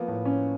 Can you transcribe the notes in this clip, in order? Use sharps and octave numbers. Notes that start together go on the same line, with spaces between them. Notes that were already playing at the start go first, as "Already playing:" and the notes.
Already playing: F3 A#3 B3
A2
C#4